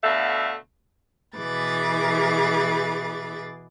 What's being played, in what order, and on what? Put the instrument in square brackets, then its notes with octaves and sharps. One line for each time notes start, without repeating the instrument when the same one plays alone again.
[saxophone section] B2 D3 A3 E5 F5
[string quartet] B2 E3 G#4 B4 D6 A6